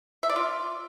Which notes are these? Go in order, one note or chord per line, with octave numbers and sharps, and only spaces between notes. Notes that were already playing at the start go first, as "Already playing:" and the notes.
E5
D5
F4